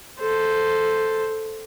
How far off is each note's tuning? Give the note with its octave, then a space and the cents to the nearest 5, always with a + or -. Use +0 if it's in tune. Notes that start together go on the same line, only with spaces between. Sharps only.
A4 +0 C5 +0